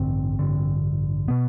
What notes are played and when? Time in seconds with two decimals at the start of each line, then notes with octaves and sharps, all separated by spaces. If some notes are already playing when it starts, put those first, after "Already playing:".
Already playing: A1 G2 D3 C4
0.39 A1 G2 D3
1.28 B2 B3